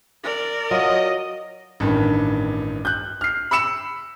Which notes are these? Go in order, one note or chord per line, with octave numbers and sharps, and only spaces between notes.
A#4 D5
F#3 F4 D#5
A1 G2 D#3
F#6 G6
F6 C7
B5 E6 C#7 E7